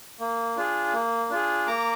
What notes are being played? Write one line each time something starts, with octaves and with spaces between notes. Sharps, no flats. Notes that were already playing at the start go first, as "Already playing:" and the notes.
A#3
D4 F4 G#4
A#3
D4 F4 G#4
A#3 A#5 D6